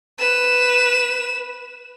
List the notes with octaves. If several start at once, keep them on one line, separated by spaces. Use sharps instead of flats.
B4 E7